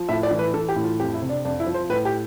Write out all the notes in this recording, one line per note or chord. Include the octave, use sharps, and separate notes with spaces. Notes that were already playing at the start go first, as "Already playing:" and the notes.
Already playing: F3
A2 E5
D5
E3
B4
E3 A4
G4
A2
F4
F2 G4
E4
C3
D4
F2 D4
E4
F3
C5
A2 B4
G4